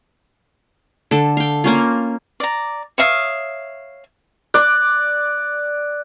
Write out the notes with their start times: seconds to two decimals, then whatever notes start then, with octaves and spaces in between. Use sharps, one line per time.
1.11 D3 A4
1.37 F5 G5
1.64 A#3 C#4 F4
2.40 D5 A#5
2.98 C#5 E5 F5 D#6
4.54 D5 F#6